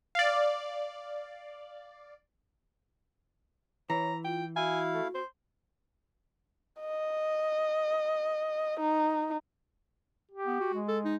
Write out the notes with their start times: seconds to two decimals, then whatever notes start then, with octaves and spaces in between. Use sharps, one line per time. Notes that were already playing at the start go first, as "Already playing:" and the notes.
0.15 D5 F5
3.90 E3 C#5 A#5
4.25 F4 G5
4.56 E4 F#4 F5 G#5
4.94 A3
5.14 C5
6.81 D#5
8.80 D#4
10.31 G4
10.47 B3
10.60 F#4
10.74 G#3
10.88 A4
11.05 D#4